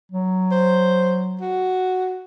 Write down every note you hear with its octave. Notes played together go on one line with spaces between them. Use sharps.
F#3
C5
F#4